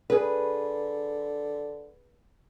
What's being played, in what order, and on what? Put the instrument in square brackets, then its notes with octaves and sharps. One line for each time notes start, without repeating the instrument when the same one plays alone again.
[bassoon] D3 [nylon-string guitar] G#4 B4